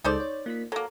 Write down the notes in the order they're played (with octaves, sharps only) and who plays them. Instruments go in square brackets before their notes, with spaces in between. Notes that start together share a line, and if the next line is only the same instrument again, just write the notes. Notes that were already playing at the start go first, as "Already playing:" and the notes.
[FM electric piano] C#2 G#3 A4 [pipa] D#4 C5 D5
[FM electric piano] C#5
A#3 F4 B6
[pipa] F#3 A#3 [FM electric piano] A4